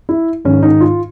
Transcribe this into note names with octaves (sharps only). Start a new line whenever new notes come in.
E4
G#2 D#3 C#4
D#4
F4